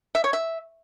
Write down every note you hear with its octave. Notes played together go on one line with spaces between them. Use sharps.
E5
C#5
E5